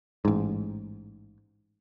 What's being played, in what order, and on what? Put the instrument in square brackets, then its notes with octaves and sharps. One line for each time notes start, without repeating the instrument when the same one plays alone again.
[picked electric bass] A1 G#2